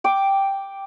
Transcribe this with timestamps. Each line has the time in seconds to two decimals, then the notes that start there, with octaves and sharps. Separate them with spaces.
0.04 G5 D6